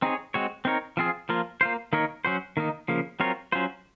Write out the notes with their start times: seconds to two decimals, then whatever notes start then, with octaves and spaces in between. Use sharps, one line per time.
0.02 C4 D#4 G#4 C#5
0.34 G#3 C4 F#4 C#5
0.65 C4 D#4 A#4 C#5
0.97 F3 C4 F4 G#4
1.29 F3 A#3 F4
1.61 A#3 F4 C5
1.93 D#3 A#3 D#4 A#4 C#5
2.25 F#3 C#4 F#4 C5
2.57 D#3 A#3 D#4
2.88 C#3 F3 A#3
3.20 F#3 C4 F4 A#4 C#5
3.52 F#3 C#4 F4 C5